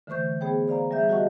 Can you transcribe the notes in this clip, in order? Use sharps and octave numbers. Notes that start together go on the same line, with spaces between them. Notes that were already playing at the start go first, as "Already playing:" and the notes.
D3 E3 A3 C5 C#6 G6
B3 G#4 C5 C#5 G5
C5 D5 F5 A#5
G3 G#4 E5 G6
F#4 G4 D#5 F#5 A5 C#6